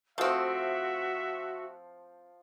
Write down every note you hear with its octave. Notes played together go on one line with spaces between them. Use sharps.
F3 A3 C4 F#4 E5 F5 G5